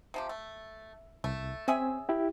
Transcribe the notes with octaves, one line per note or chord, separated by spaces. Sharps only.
C3 F3 G4
A3
C2 A3
C4 C#4 G#4 E5
E4 G4